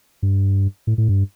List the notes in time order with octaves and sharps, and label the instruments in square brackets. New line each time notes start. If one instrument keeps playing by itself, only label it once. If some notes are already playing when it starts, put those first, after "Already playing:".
[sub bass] G2
A2
A2
G2